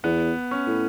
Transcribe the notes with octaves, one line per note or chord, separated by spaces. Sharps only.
E2 B3
C#4
A2